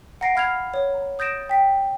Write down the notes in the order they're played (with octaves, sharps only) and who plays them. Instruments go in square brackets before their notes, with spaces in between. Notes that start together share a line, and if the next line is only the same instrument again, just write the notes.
[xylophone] F#5 A#5 A#6 C7 D7
F5 B5 F6 G#6 C7 F7
C#5
A#5
D#6 G6 A6 A#6 D7 E7
G5 B6